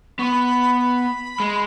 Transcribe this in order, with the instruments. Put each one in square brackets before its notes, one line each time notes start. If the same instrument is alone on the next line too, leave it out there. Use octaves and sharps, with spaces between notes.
[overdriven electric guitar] B3 [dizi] C#6
[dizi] B5
B5
[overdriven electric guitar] G#3